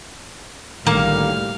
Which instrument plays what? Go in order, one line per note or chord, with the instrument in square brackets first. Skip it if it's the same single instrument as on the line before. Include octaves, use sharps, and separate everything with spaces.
[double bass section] B1 A2 G3 [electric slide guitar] D3 D#3 [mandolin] A#3 [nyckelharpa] F5